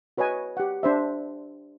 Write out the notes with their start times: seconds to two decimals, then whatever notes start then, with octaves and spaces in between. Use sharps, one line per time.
0.17 F#4 B4 C#5 D#5 G#5
0.57 G4 F#5
0.83 D4 C5 E5